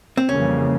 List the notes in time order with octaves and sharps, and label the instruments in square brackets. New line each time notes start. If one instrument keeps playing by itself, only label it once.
[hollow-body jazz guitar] C4
[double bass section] F2 C#3 E3 G3 A#3 [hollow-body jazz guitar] C#4